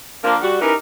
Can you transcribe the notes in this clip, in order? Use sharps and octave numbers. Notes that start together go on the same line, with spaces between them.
F3 A#3 D4
G3 F#4
C#4 D#4 E4 G4 A#4 B4